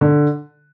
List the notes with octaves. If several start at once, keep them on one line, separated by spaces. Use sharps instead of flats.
D3